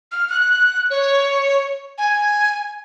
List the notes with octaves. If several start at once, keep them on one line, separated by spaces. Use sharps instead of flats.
F6
F#6
C#5
G#5